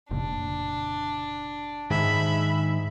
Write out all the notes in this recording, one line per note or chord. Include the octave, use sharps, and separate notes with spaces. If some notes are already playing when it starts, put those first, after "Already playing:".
F1 A#2 C#3 D4
G#2 D#3 G#3 E5 B5